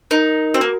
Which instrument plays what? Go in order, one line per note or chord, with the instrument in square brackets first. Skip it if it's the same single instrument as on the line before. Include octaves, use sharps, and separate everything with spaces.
[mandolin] D#4 [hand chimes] A#4
[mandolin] C4 [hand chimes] F#4
[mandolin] A#3